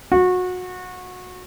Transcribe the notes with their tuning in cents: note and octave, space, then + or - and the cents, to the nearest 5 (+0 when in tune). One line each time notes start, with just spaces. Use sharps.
F#4 -25